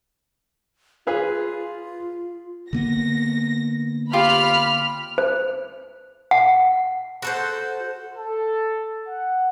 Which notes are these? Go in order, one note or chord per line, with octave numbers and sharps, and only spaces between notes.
F4 G#4 B4 F5
D3 A#3 B3 A#6
F4 G4 B5 F6
C5
F#5
F#4 A4 C5
A4
F#5